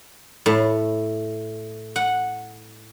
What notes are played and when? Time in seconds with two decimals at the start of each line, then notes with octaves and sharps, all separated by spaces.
0.46 A2
1.96 F#5